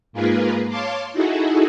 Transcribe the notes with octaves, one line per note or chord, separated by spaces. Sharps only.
G#2 A#3 F4 G#4 A#4 B4
C#5 F5 A5 C6 D6
D#4 E4 F#4 G#4 A4